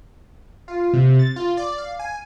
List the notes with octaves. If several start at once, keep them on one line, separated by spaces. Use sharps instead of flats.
F4
C3
A6
F4
D5
F5
G#5